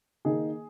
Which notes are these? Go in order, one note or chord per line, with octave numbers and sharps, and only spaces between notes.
D#3 A#3 D#4 G#4